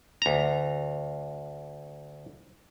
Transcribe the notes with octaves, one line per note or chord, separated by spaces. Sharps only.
D2 A#5